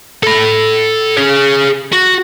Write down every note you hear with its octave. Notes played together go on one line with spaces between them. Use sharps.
A4 B5
G#4 C#5
F#4